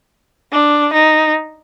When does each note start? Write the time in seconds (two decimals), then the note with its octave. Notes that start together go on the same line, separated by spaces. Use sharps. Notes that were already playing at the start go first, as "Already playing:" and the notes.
0.52 D4
0.93 D#4